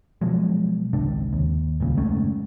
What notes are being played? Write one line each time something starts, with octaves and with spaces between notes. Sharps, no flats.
B2 F3 F#3 G#3
G#1 C#2 C3 D4
D#2
D#1 C#2 A#2 C#3
F#1 G#2 A3 C#4